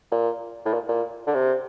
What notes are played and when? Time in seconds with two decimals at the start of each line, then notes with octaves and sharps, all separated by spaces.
0.12 A#2
0.65 A2
0.73 A#2
0.88 A#2
1.27 D3
1.34 C3